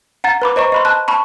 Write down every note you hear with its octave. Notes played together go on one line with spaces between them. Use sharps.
F#5 A#5 A6
B4 B5 D6
C5 D#5 A#5 C#6
D#5 B5 C6
A5 F#6
A5 B5 C#6